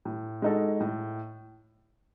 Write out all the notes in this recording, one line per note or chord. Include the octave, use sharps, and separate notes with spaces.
A2
G#3 D#4 F#4 A4
A2